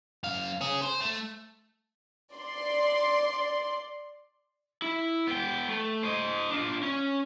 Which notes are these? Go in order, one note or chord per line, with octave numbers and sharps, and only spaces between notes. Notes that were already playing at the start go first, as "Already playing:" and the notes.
F#2 F5
C#4 G#4
C5
A3
D5 C6
E4
B3 G5
A3
C5 D#5
D4 F4
C#4